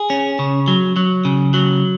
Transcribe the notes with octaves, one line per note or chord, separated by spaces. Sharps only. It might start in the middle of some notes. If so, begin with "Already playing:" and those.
Already playing: G#4
C#4
C#3
F#3
F#3
C#3
F#3